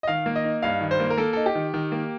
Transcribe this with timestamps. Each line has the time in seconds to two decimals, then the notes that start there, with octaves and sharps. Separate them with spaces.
0.03 D#5
0.08 D#3 F5
0.26 A#3
0.36 D#5
0.44 D#4
0.63 G2 F5
0.81 D#3
0.91 C5
1.00 A#3
1.10 A#4
1.17 A#3 A4
1.33 D#4 A4
1.46 G4
1.55 D#3
1.74 D#3
1.92 A#3